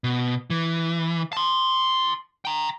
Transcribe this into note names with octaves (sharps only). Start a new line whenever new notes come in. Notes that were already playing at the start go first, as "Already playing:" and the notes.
B2
E3
A5 C6
G5 A#5